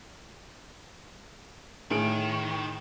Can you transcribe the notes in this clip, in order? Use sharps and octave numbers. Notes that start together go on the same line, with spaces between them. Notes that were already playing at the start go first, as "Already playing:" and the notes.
A2 D#3 G#4 D7